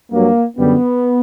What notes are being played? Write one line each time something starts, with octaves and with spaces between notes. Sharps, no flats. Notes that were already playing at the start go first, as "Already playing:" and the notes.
G2 F#3 A#3
F#2 D3 G3 B3